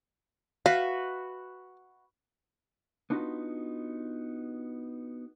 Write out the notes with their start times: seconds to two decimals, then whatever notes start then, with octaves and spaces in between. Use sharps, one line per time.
0.66 F#4 B4 E5 F5
3.10 B3 D4 D#4 F4 F#4 B4